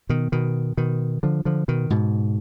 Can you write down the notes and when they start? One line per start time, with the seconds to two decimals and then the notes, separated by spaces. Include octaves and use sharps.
0.09 B2 D#3
0.32 B2 D#3
0.77 B2 D#3
1.23 D3 F3
1.45 D3 F3
1.68 B2 D#3
1.90 G#2 B2